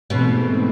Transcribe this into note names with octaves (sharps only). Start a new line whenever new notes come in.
G#2 B2 E3 A3 C4